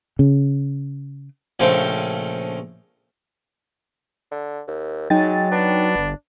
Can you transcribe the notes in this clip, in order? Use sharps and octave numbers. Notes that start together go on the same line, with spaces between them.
C#3
A#1 C#3 F3 A3 C5 G5
D3
D#2
F#3 G#3 D#4 G5 A6
B3 D4
G1